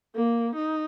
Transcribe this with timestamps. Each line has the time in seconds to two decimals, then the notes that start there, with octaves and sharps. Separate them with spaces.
0.15 A#3
0.55 D#4